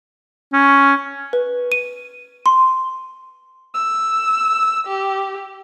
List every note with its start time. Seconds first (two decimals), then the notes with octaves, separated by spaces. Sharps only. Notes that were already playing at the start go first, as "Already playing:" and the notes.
0.53 C#4
1.33 B4
1.72 D#7
2.46 C6
3.74 E6
4.87 G4